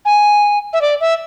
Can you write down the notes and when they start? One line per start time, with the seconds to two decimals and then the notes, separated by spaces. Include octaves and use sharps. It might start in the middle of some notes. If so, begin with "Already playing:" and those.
0.05 G#5
0.73 E5
0.81 D5
1.01 E5